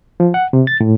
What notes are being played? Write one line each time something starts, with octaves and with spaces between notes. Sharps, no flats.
F3
F#5
C3
A6
A2